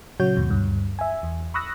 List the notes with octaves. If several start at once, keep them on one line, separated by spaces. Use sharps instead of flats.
A#2 C#3 F#3 F#4 C#5 G6
D#2 G#2 B2
D2 G2
E5 G#5
E2
B5 C#6 D#6 E6 F#6 A#6